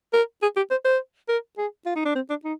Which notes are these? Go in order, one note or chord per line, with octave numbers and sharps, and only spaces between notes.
A#4
G#4
G4
C5
C5
A#4
G#4
F4
D#4
D4
C4
D4
D#4